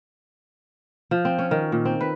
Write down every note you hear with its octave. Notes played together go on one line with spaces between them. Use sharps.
F3
C4
C#4
D#3
A#2
C4
B4